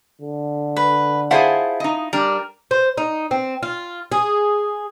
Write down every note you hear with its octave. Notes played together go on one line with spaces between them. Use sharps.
D3
B4
E4 F4 G#4 C5 F#5 A5
D#4 D#5
G3 D4 A#4
C5
D#4
C4
F4
G#4